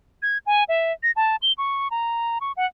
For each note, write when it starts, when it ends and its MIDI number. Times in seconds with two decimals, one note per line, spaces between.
0.22 0.38 92
0.46 0.64 80
0.69 0.93 76
1.03 1.11 94
1.16 1.36 81
1.42 1.53 103
1.58 1.88 85
1.91 2.39 82
2.41 2.52 85
2.57 2.66 78